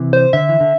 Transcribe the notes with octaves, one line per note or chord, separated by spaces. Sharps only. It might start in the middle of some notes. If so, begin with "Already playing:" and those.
Already playing: C3 E3
C5
D3 E5
E3
D3